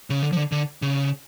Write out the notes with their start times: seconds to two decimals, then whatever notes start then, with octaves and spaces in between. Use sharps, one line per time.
0.10 C#3
0.22 D3
0.33 F3
0.37 D3
0.52 D3
0.82 C#3